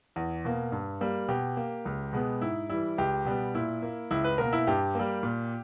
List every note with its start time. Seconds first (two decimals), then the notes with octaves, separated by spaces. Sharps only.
0.16 E2
0.45 B2 A#3
0.72 G2
1.01 G3 A#3
1.28 B2 G4
1.57 A#3
1.85 C#2
2.13 B2 G#3 B3
2.41 G#2 E4
2.69 E3 G3 E4
2.98 C#2 G4
3.25 B2 G3 B3
3.55 A#2 E4
3.82 A#3
4.11 C#2 E4
4.24 B4
4.38 B2 A#3 A#4
4.53 E4
4.67 G2 G4
4.95 G3 A#3
5.23 A#2